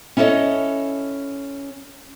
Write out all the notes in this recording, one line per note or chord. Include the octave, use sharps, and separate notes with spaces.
C#4 E4 A4 B4 C#5 D#5